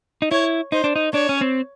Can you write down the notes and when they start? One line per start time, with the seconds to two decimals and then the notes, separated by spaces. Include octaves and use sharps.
0.22 D#4
0.31 E4 C#5
0.72 D#4 C5
0.84 D4
0.96 D#4
1.14 D4 C#5
1.29 C#4
1.41 C4